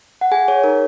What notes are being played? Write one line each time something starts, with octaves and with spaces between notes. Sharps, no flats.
F#5
G#4 G#5
G#4 C#5
D#4 A#4